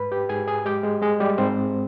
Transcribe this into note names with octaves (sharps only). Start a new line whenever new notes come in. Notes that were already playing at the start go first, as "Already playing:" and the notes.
Already playing: G#2 B4 B5
G4 G5
G#2 G#4 G#5
G#4 G#5
G#3 G4 G5
G#3 G#4
G#3 G#4
G3 G4
G#2 C4 C5